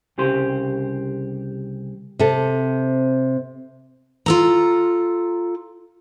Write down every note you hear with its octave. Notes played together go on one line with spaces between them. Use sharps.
C2 C#3 G4 C5 C6
C3 C4 A4
F4 A4 A#5